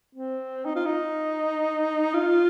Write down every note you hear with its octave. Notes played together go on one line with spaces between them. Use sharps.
C4
D#4
F4
D#4
F4